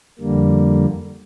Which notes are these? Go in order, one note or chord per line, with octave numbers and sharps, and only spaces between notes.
F2 D3 G3 A#3